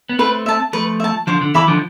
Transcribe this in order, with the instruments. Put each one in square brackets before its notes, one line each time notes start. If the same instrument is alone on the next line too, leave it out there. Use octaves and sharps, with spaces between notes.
[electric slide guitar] B3
[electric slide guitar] A3 C4 [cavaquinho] B4
[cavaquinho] E5 A5
[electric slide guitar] F3 A3 [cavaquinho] B4
[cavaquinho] E5 A5
[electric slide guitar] D3 F3 [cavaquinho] C5
[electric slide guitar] D3
[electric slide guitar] E3 [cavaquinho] E5 B5 D6
[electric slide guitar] D3 F3